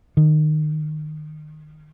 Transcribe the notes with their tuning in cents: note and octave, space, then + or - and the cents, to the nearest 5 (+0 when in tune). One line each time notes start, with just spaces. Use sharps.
D#3 -25